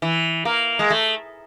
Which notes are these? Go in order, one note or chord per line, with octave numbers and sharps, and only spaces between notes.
E3
A#3
G#3
A3